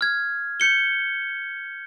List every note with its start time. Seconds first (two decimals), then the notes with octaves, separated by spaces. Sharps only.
0.01 F6 G#6
0.60 G6 C#7 G7